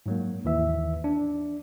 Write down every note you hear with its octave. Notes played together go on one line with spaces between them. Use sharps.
G#2 F#3 A#3
D#2 E3 E5
D4